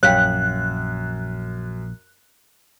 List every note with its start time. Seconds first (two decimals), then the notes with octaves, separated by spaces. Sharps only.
0.03 A#1 F#2 C#5 F5 G5 F#6